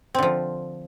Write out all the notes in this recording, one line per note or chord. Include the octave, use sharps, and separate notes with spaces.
D3 F3 C4